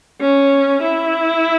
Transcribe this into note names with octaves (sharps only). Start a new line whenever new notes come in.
C#4
E4